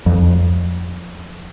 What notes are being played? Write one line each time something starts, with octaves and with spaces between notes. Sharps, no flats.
F2